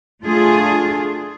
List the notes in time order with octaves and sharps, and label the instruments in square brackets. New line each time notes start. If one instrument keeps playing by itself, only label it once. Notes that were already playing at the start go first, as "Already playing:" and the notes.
[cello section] A3 D4 F4 G#4